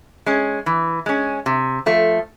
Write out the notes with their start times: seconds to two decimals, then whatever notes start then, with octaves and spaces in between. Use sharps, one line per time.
0.26 G#3 C#4
0.66 E3
1.06 G#3 C#4
1.46 C3
1.86 F3 A3